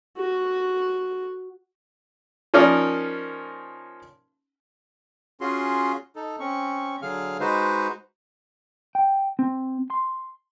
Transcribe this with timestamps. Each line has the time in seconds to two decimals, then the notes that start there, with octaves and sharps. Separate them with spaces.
0.18 F#4
2.54 F3 A#3 C#4 D#4 A#4 D5
5.41 C#4 F4 F#4 G#4 C6
6.16 D#4 A4
6.40 C4 C#4 C#6
7.02 D3 F#3 G#4 F5 F6
7.40 G#3 D#4 F#4 B4 C5
8.95 G5
9.39 C4
9.90 C6